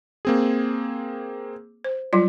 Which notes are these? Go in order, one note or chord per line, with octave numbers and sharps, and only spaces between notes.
A#3 C4 G#4
C5
F#3 G3 F4